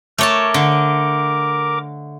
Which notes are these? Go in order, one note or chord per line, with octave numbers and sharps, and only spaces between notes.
A3 A#4 C#5 A5 D6
D3